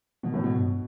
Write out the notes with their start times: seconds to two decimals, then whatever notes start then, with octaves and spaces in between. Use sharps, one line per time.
0.23 B2 D3
0.34 A2 E3
0.44 B2 E3
0.55 G2 B2